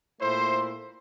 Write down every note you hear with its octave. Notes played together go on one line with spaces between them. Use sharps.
A#2 A3 E4 C5